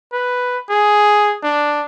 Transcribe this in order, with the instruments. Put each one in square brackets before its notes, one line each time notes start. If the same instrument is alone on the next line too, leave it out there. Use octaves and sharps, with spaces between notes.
[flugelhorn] B4
G#4
D4